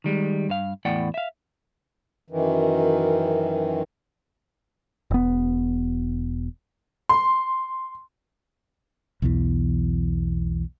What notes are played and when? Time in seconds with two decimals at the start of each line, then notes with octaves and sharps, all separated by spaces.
0.04 D#3 G3 G#3
0.49 G2 F5
0.85 E2 A2 D5 F#5 G5
1.14 E5 F5
2.30 F#2 D#3 E3
5.11 E1 B3
7.09 C6
9.22 B1 E2 B2 E3